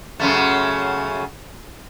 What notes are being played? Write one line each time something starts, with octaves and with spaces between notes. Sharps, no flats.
F#2 C#3 A3